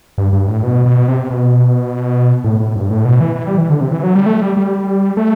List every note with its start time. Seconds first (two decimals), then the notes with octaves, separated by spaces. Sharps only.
0.18 G2
0.33 G2
0.48 A2
0.63 B2
0.86 B2
1.08 C3
1.30 B2
2.44 A2
2.60 A2
2.75 G2
2.90 A2
3.05 B2
3.20 E3
3.36 E3
3.47 G3
3.58 E3
3.70 D3
3.81 C3
3.92 E3
4.03 F#3
4.15 G3
4.26 A3
4.41 G3
4.57 G3
5.17 A3